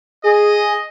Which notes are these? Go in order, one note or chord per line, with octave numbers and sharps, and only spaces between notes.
G#4 D#5